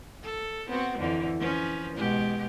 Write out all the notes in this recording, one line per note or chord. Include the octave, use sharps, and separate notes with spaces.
A4
B3 C4 F#4
F2 D3 E3
F3 C#4 B4
B2 G#3 G4